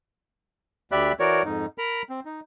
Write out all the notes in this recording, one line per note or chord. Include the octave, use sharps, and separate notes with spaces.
D2 G4 D5 E5 B5 F#6
E3 F#4 A#4 C#5 D5
F2 G#2 D#4
A#4 A#5 B5
C4
D#4